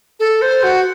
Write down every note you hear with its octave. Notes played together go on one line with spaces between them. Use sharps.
A4
C5
F#4